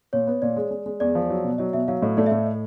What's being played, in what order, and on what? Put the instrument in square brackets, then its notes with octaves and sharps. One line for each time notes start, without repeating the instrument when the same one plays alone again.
[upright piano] A#2 [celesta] C#5
[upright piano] B3
[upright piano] A#2 [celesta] D5
[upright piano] G#3
G#3
G#3
[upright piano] E2 [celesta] D5
[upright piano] F3
F#3
B2
[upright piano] F#3 [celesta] D#5
[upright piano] B2 [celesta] E5
[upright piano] F#3 [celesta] F5
[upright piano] A2 [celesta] D#5
[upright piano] A3 [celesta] D5
[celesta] E5
[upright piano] A2
[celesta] D#5